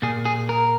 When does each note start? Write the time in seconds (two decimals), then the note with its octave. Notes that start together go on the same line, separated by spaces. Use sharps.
0.02 A#2 A#3 G#4
0.25 G#4
0.49 A#4